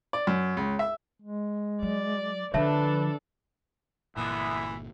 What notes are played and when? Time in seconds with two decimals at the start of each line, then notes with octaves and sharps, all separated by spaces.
0.13 D5
0.27 F#2
0.57 C#2
0.79 E5
1.22 G#3
1.82 F#3 D5
2.54 D3 F3 D4 A4 B4 C#5 E5 A5
4.17 G1 A#2 D3 E3 G#3 A#3 B3 E5